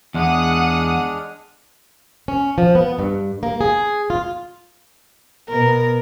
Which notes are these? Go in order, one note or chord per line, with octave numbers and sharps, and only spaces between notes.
E2 G#3 D4 F#5 D#6 F6
C#4
F3
B3
G2
A#3
G#4
F4
B2 B3 A#4